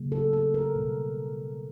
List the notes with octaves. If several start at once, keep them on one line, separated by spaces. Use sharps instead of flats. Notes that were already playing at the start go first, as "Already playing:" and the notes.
Already playing: C#3 F#3 A#3
A4
A4
A#4
B2 G3 B3